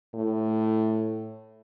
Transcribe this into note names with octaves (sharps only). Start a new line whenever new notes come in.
A2